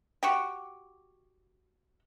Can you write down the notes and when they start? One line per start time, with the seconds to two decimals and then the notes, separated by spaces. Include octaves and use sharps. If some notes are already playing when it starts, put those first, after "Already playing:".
0.23 F#4 G4